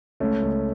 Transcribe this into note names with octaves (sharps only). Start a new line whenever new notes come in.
C#2 A3 C#4
C#2